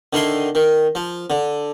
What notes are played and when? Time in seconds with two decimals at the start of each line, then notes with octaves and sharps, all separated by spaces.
0.13 D3 D#3 E4 C6
0.55 D#3
0.95 F3
1.30 D3